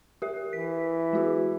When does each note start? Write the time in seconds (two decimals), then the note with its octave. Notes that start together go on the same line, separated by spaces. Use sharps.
0.22 G4 A#4 E5
0.53 E3 B6
1.13 G#3 F#4 G#4